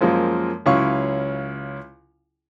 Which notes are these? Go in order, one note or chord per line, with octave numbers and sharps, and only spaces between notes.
F#2 F3 G#3 A#3
C#2 F#3 C#4 E4 F5 C#6